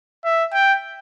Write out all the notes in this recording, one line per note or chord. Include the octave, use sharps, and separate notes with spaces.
E5
G5